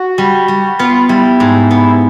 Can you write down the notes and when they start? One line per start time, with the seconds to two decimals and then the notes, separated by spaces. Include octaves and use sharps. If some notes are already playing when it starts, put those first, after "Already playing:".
Already playing: F#4
0.18 G3
0.48 G3
0.79 B3 F4
1.09 G3 E4
1.40 G#2
1.71 B3